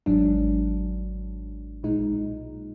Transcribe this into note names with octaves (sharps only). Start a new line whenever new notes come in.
G#1 G#2 F#3 D4
B1 A#2 G#3 D#4